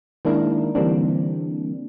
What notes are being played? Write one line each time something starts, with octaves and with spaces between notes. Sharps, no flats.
D#3 G#3 A#3 D4 E4 A#4
D3 E3 G3 A#3 C4 D4